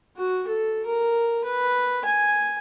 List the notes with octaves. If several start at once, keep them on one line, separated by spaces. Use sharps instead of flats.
F#4
A4
A#4
B4
G#5